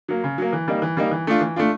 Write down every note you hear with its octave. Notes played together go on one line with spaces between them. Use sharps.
F#3 A#3
C#3
F#3 A#3
E3
G3 A#3 D#4
E3
G3 A#3 D#4
E3
A3 D4 F4
E3
A3 D4 F4